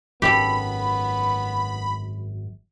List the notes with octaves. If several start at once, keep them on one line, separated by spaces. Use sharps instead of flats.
G#1 F#2 B3 G4 A4 B5